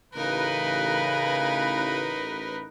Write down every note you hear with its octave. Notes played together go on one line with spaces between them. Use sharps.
A1 C#3 D#4 A#4 B4